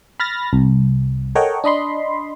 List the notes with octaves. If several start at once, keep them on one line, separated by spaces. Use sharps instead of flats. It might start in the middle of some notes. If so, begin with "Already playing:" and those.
B5 F6 A6 A#6
C2
A4 A#4 C#5 D#5 F#5 G5
D4 D#5 B5 C6